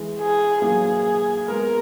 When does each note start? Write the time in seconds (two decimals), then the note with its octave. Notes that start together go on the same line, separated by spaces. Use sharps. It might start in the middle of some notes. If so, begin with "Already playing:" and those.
Already playing: E3 G#3
0.20 G#4
0.62 F#3 A#3 G#4
1.48 G#3 B3 A#4